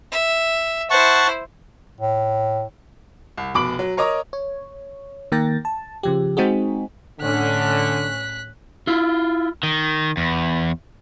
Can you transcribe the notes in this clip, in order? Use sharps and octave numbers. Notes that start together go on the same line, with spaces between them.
E5
E4 C5 F#5 A5 C#6
A2
C2
F1 B2 B5 D6 D7 F#7
F#3
A#4 C#5 D#5 A#5 D6 D#6
C#5
D#3 A#3 A#4 G5 A6 A#6
A5
C#3 F3 G4
G#3 C4 D#4 F#4 G#4
A2 D3 C#4 F#6 B6
E4 F4
D#3
E2